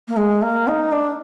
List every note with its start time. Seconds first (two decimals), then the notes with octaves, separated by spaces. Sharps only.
0.08 A#3
0.17 G#3
0.42 A#3
0.67 D#4
0.92 D4